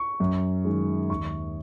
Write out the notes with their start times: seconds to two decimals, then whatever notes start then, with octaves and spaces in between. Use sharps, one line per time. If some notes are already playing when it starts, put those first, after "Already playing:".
Already playing: C#6
0.20 F#2
0.65 D#3 G#3
1.10 D#2 C#6